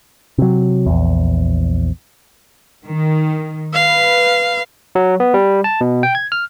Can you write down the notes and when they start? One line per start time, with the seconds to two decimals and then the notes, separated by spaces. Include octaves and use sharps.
0.38 C3 F#3
0.86 A#1 E2
2.87 D#3
3.74 B4 F5
4.95 F#3
5.20 B3
5.34 G3
5.64 A5
5.81 B2
6.03 G5
6.15 G#6
6.32 F6